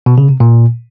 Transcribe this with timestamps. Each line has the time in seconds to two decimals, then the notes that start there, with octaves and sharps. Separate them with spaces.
0.06 B2
0.18 C#3
0.29 C3
0.40 A#2